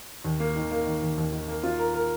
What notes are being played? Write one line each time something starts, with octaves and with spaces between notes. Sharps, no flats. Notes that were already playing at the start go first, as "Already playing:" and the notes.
D#2
A#3
D#3
A#3
D#3
D#2
D#2
D#3
A#3
F4
A#4
A#4